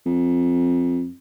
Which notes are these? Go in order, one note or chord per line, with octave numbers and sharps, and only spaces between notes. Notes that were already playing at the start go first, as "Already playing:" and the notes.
F2